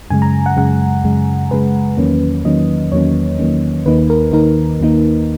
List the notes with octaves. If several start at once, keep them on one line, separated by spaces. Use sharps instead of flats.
F#2 C#3 G#3 G#5
A#5
F#5
F#2 C#3 G#3 F#5
F#2 C#3 G#3
F#2 C#3 G#3 B4
E2 D#3 F#3 A#3 C#4
E2 D#3 F#3 A#3 C#4 D#5
E2 D#3 F#3 A#3 C#4 C#5
E2 D#3 F#3 A#3 C#4
D#2 D#3 A#3 D#4 B4
A#4
D#2 D#3 A#3 D#4 A#4
D#2 D#3 A#3 D#4